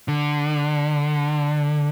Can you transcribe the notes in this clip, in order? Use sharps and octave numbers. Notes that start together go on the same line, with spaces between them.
D3